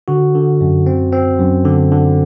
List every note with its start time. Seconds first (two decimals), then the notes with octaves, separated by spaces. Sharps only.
0.08 D3 F#4
0.35 D3
0.61 F#2
0.86 C4
1.12 C4
1.39 F#2
1.65 D3
1.91 D3